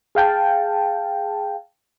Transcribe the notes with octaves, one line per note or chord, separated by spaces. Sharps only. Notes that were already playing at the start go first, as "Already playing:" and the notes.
G#4 F5 G5 A5